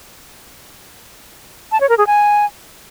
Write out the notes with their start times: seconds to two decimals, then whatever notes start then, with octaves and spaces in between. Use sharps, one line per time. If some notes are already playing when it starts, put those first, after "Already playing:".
1.72 A5
1.80 C#5
1.89 A#4
1.98 G#4
2.07 G#5